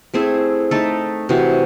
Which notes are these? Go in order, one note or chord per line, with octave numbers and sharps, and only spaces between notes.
A3 C4 E4 G#4
A3 D#4 A4
C3 E3 C4 F#4